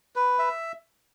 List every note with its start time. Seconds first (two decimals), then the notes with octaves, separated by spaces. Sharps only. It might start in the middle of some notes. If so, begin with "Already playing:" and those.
0.16 B4
0.39 E5